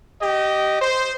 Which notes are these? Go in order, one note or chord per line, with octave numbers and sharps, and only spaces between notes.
G4 D#5
C5